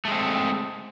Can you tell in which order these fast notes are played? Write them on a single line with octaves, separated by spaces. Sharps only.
A3 G#3 C4